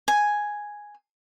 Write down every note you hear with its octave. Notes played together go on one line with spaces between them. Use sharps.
G#5